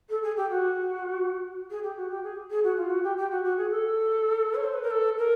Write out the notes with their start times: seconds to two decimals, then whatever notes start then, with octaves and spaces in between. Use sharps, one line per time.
0.09 A4
0.23 G#4
0.36 G4
0.50 F#4
1.70 G#4
1.83 G4
1.97 F#4
2.10 G4
2.23 G#4
2.50 G#4
2.64 F#4
2.77 F4
2.90 F#4
3.03 G4
3.17 G4
3.31 F#4
3.44 F#4
3.57 G#4
3.70 A4
4.55 C#5
4.63 C5
4.73 B4
4.82 A#4
4.91 A4
5.18 A#4